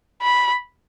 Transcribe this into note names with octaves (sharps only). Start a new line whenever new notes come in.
B5